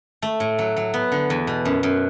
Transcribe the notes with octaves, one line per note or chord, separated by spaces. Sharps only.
A3
A2
F#3
F#3
B3
D3
E2
B2
F#2
F#2